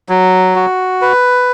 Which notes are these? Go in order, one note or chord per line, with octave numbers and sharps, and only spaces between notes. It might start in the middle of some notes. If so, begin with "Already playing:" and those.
F#3
F#4
B4